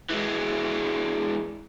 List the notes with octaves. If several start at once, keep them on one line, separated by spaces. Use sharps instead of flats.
E3 G#3